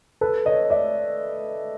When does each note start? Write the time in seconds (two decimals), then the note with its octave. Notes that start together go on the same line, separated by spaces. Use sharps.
0.21 A4 B4
0.46 C#5 D#5
0.70 D5 E5